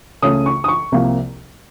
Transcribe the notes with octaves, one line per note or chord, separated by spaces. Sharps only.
C#2 C#3 A3 C#4 D#6
C#6
D#6
C#6
C2 C3 F3 A#3